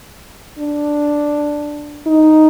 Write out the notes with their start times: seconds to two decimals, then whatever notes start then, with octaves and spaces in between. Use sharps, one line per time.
0.59 D4
2.07 D#4